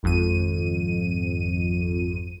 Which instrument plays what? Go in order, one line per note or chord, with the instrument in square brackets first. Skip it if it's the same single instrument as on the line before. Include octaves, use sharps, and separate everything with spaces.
[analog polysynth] G#1 F2 D#7